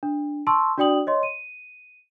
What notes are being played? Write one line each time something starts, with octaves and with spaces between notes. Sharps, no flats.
D4
A5 C6 C#6 E6
D4 F#4 D5 G5 D#6 F#7
C#5 D#5 C6
D#7